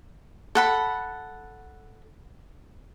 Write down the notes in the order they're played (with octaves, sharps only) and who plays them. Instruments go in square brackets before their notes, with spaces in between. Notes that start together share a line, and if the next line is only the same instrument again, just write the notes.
[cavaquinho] A4 F#5 B5